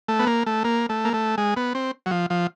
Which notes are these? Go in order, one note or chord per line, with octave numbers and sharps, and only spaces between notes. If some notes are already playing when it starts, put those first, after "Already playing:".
A3
B3
A#3
A3
A#3
A3
A#3
A3
G#3
B3
C4
F#3
F3
F3